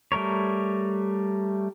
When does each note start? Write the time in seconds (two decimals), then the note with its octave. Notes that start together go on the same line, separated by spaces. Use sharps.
0.12 G3 A3 A#4 C#5